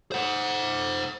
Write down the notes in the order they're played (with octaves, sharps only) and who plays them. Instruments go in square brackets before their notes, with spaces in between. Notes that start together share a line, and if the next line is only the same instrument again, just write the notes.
[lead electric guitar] C5 F#5